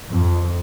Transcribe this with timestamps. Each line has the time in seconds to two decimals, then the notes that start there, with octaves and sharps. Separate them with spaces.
0.11 F2